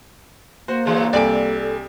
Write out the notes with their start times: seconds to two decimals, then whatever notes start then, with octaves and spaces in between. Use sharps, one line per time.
0.68 A#3 F#4 C5
0.85 D3 E3 F#3 G#4
1.13 C2 A4 D5 G#5 D7